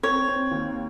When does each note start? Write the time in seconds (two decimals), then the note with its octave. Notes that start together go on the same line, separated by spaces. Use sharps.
0.03 C4 C#5
0.28 C4
0.51 D#2